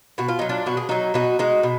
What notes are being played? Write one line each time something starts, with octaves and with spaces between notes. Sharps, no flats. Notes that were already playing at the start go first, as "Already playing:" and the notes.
B2 F#4
F4
F#3 D#4
D4 F4
B2 F#4
G#4
F#3 D#4 F#4
B2 D#4 F#4
G#3 D#4 F#4
B2